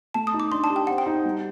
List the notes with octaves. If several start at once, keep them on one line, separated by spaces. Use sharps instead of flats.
A3 A5
D#6
D#4
D6
D4 C6
A5
G4
G5
C4 F#5
G5
D#4
G3